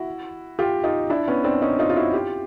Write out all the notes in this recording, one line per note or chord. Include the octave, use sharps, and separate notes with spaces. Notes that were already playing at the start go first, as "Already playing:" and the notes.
Already playing: E4 F#4
F4 G4
D#4 F4
D4 E4
B3 C#4
C4 D4
C#4 D#4
D#4 F4
F4
E4 F#4
F4 G4